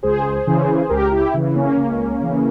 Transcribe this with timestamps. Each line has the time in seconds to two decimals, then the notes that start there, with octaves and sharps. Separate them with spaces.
0.03 C#2 G#4 C5
0.47 C#3 E3
0.89 C#2 G4 A#4
1.12 E4 G4
1.34 C#3 E3
1.55 A#3 C#4
1.77 C#2
2.20 C#3 E3